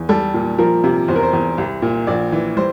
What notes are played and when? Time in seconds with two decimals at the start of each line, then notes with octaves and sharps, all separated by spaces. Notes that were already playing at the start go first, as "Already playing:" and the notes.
Already playing: E2
0.09 G3 A4
0.34 A#2
0.58 F3 A#4
0.84 C3
1.08 E2 C5
1.16 A#4
1.23 C5
1.33 E2
1.58 C2
1.82 A#2
2.07 A#1 D5
2.32 E3
2.57 G3 C5